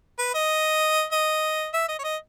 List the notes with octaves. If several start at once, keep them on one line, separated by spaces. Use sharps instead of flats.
B4
D#5
D#5
E5
D#5
C#5
D#5